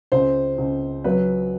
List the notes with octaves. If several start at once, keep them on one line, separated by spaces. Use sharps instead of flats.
C#2 C5
C#2
F#3 B4